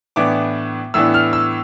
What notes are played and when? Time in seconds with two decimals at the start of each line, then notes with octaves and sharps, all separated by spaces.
0.16 A2 E3 B3 D4 D6
0.94 A2 E3 B3 D4 E6
1.14 F6
1.33 E6